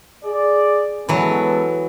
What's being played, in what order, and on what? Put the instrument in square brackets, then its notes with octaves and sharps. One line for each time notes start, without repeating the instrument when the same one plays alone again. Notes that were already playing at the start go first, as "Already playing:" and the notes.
[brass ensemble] G#4 D5
[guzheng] E3 F#3 [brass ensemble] G#3 B3 A4